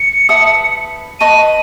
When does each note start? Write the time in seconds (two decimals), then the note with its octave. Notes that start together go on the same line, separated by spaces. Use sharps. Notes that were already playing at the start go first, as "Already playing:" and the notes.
Already playing: C#7
0.29 B4 E5 A5 D#6
1.20 B4 D#5 A5 C#6 D#7